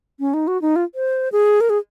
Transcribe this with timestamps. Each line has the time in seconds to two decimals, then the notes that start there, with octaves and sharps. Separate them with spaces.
0.20 C#4
0.34 D#4
0.47 F#4
0.62 D#4
0.76 F4
0.95 C5
1.32 G#4
1.61 A#4
1.70 G#4